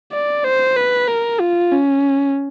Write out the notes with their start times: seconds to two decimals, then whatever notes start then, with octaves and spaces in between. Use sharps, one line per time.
0.12 D5
0.44 C5
0.76 B4
1.08 A#4
1.40 F4
1.72 C#4